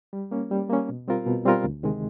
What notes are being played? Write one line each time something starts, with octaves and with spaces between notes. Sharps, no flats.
G3
A#3 C#4
G3
A#3 C#4
B2
G3 C4 F4 A#4
B2
G3 C4 F4 A#4
D2
C3 D#3 G#3